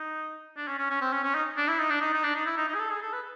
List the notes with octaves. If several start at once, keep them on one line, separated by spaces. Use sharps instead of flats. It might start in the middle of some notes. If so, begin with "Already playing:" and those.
Already playing: D#4
D4
C#4
C#4
C#4
C4
C#4
C#4
D#4
D4
E4
D#4
D4
D#4
D#4
D4
D#4
E4
D#4
D#4
G#4
A4
G#4
A4
B4